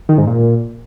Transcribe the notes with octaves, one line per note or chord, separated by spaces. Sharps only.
D#3
G#2
A#2